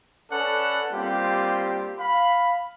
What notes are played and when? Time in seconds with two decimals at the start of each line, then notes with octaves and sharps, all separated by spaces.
0.31 C#4 A4 B4 D5 F#5
0.92 G3 A#3 C4 F4 G4
1.99 F5 B5